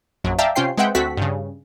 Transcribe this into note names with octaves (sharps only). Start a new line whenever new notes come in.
A#1 F#2 F#3
D5 E5 F5 G5 A5 A#5
C3 C#4 F4 C5 G5 C7
G#3 C4 B4 E5 F#5 G5
D2 C4 F#4 A4 F#5 B6
G2 C#3